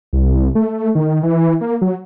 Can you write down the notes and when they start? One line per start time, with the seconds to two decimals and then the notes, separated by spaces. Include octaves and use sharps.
0.13 C2
0.55 A3
0.95 D#3
1.23 E3
1.61 A#3
1.81 F#3